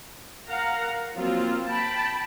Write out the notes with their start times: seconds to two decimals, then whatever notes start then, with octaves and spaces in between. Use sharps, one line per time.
0.48 A#4 F5 F#5 A#5
1.16 F3 F#3 A#3 C4 F4
1.68 G5 A5 B5